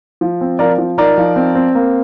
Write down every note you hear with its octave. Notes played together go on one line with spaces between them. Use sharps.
F3
C4
F3 A#4 D5
F3
D#4 A#4 D5
F3
C4
C4
A#3